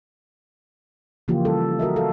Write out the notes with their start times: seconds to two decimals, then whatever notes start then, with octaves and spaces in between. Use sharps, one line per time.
1.28 C#3 E3 F3 A#3 F4 G4
1.45 G3 A4
1.79 F#4 A#4 D#5 E5
1.96 A4 F5